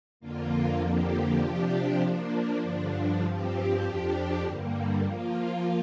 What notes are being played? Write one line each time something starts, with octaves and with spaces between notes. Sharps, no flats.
F2 D3 A#3 F4
F2 D3 F3 A#3 G4
C3 F3 D4 G4
F3 A#3 D4
G2 D3 F3 D4
G2 F3 C4 G4
F2 F3 D4 G4
G2 D3 G3 A#3
F3 A#3 F4